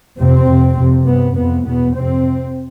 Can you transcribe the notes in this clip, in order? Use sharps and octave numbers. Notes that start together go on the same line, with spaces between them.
F2 C3 C4
F2 C3
F2 C3
G2 B3
F2 C3 B3
E2 B2 B3
F2 C3 C4